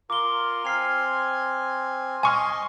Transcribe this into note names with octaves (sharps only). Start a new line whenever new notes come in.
F4 A#4 D6 G7
C4 G#5 F6 C7 F7
D#5 G#5 C6 C#6 F6